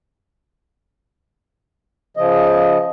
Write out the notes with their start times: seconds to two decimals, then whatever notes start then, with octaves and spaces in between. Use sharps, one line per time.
2.17 C#3 F3 D#5